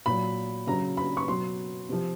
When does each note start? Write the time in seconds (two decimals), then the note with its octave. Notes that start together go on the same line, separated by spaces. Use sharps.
0.06 A#2 F#3 B5
0.67 C#3 F#3 A#5
0.97 B5
1.17 C#6
1.28 B2 F#3 C6
1.89 C3 F3